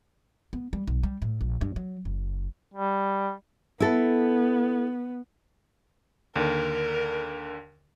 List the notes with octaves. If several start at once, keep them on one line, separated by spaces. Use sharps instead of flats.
B3
G3
B1
G3
A2
A#1
G2
F#3
F#1
G3
B3 E4 A4
D#2 D3 A#4